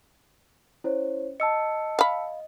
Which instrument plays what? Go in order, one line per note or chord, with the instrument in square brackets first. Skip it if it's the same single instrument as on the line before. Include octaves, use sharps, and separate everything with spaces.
[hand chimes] C#4 [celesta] E4 C5 C#5
[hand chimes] D#5 [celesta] A5 E6 C#7
[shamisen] F5 B5